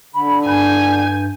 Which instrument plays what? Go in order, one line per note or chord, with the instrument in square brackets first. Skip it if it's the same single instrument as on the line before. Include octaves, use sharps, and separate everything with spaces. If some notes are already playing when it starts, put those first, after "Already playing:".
[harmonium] D3 [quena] B5
[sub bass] G2 [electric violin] G#5 [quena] G6